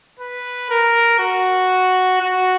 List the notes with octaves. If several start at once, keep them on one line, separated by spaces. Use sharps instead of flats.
B4
A#4
F#4
F#4